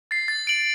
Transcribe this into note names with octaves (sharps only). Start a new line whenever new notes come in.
A6 C7
A6
D7 F#7